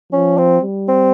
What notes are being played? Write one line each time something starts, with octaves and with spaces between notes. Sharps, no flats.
F3 C#4
C4
G3
C4